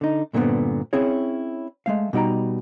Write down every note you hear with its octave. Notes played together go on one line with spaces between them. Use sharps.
D3 D#4
G2 A#2 D3 G3 B3 C4
C4 C#4 E4 G#4 C#5
G#3 A3 F5
B2 G3 D#4 G5 A#5